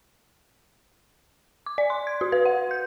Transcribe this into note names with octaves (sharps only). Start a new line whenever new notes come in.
D6
D5
C6
G#6
F#4
B4
F#5
G6